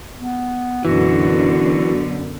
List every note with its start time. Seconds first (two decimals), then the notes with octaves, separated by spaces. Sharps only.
0.16 B3
0.85 F#2 B2 D3 E3 F#4